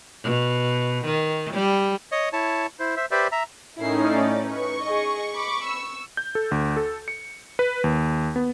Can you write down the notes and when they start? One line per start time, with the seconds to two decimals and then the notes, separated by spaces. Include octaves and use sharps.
0.24 B2
1.05 D#3
1.54 G3
2.12 C#5 D#5
2.33 E4 C#5 A5
2.80 E4 C5
2.96 C5 E5
3.11 G4 B4 C5 D5 E5
3.32 E5 A#5
3.77 A2 C#4 D#4 E4 A#4 C7
4.09 D5
4.48 B4 C#6
4.83 G#4 D#5
5.33 B5 D6
5.66 E6
6.17 G6
6.35 A4
6.51 D2
6.77 A4
7.08 C#7
7.59 B4
7.84 D#2
8.36 B3